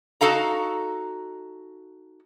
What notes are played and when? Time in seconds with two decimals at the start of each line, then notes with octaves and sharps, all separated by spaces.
0.21 D#4 F#4 A4 F5 A#5